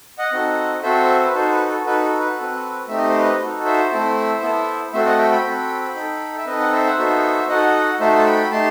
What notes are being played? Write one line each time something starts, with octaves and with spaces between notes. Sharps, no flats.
D#5 F#5
C4 D#4 F#4 A4
C4 F#4 A4 C5 E5
B4
D#4 F#4 A4 C5
B4
A4
D#4 F#4 A4 B4
A4
B4
C4 F#4 A4
A3 C4 D#4 G4 E5
D#5
C5
B4 D#5
D#4 F#4 A4
C5 E5
A3 C4 E4 A4
B3 E4 A4
A3 C4 F#4 A4 C5 E5
D#5 F#5
E5 G5
G5 B5
C4 F#4 A4
D#4 A4
E5
C4 D#4 A4 B4 D#5
F#5
C5 E5
F#5
B3 D#4 F#4 A4 C5 E5
D#4 F#4 A4 D#5 F#5
A3 D#4 F#4 A4 C5 E5
A5
G5 B5
A3 D#4 G4 A5 C6